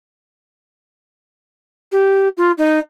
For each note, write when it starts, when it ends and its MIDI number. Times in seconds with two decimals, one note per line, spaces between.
1.92 2.28 67
2.37 2.51 65
2.58 2.79 63